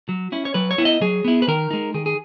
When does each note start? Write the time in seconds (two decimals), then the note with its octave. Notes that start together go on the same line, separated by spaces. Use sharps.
0.09 F#3
0.32 C#4 E4
0.45 C#5
0.54 F#3 B4
0.71 C#5
0.78 B3 E4
0.85 D#5
1.01 F#3 G#4
1.25 B3 E4
1.42 B4
1.48 D#3 A#4
1.71 G#3 D#4
1.94 D#3 G#4
2.06 G#4